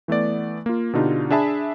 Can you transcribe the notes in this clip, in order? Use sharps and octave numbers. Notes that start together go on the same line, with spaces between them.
E3 A3 B3 D5
A#3 F4
B2 D3 D4 D#4 F4 G4
D4 G#4 E5 A5 B5